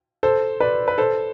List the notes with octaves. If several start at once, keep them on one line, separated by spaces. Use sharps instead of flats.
A4 C5
B4 D5
B4
A4 C5